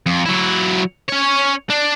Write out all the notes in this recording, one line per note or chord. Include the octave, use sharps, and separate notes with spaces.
F2
F#3 E4
C#4 C#5
D4